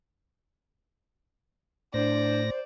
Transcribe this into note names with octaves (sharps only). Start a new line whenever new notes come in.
A2 D4 C5 D5 A#6